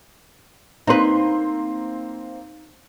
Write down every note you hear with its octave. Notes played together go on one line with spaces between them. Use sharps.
A#3 C4 D#4 B4 C6